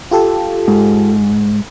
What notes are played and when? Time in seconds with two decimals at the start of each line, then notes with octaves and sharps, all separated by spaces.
0.11 F4 G4 A4
0.68 G#2